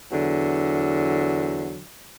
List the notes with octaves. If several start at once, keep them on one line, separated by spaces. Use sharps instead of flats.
E2 D3 F#3